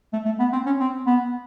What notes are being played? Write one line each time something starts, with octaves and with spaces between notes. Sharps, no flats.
A3
A3
B3
C4
C#4
C4
B3